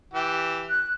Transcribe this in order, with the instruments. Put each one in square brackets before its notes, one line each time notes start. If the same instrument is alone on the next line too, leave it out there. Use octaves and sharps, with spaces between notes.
[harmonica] E3 G4
[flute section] F#6